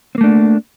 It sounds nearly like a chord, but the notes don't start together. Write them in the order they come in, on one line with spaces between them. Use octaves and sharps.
C4 A#3 A3 D4